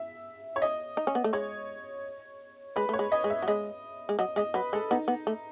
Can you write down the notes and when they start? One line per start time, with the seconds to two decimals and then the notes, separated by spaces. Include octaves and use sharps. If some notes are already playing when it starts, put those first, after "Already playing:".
Already playing: E5
0.56 C#5
0.62 D#5
0.97 D#4
1.07 C#4
1.15 B3
1.24 A3
1.33 G#3 C#5
2.76 G#3 B4
2.89 A3 C#5
2.99 G#3
3.12 D#5
3.24 G#3
3.30 E5
3.42 F#3
3.48 G#3 D#5
4.09 G#3
4.19 F#3 D#5
4.36 G#3 D#5
4.54 F#3 B4
4.73 G#3 A4
4.91 B3 D#4
5.08 B3
5.27 A3